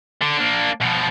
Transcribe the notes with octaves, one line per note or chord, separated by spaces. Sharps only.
D3
A#3 D4
B2 F3